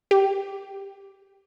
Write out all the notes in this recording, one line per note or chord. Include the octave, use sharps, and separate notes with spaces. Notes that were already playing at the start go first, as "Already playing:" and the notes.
G4